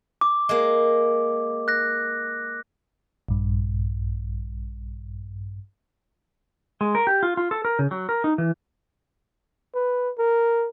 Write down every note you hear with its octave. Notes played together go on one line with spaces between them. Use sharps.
D6
G#3 A#3
F#6 A#6
A#1 G2
G#3
A#4
G4
F4
F4
A4
A#4
C#3
F#3
A#4
D#4
E3
B4
A#4